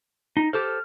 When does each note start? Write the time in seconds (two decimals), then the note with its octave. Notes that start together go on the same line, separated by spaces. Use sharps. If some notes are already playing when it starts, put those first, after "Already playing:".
0.37 D#4
0.53 G4 A4 C5 F6